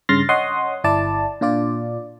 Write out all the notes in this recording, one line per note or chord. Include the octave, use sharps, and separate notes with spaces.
G2 C#3 C6 F6 A6 A#6
C#5 D#5 F#5 C6 D#6
G1 E4 D5 A5
A#2 D4 F4 D5